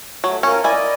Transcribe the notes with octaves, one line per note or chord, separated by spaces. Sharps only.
F#3 A3
C#4 F4 A#4
E4 D5 D#5 G#5